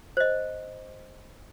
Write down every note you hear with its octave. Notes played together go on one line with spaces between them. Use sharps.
C5 D#5